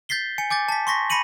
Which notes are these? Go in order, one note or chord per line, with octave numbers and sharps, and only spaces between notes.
G6 A6 B6 C7 G7
G#5 C#7
G#5 D6 G6 A6
A5 B6
C6 C#6 A#6 B6
B5 A#6 C#7 D#7 F#7